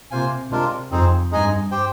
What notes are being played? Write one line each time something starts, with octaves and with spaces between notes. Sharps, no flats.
C3 A#3 F4 C5 F5 G#5
C3 G#3 D4 F4 A#4
F2 C4 D#4 G#4 C5
G2 G#3 D#4 G#4 D#5 G#5
G4 C5 G5